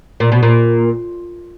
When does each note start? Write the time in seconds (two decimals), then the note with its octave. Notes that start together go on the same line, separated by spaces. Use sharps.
0.20 A#2
0.32 B2
0.43 A#2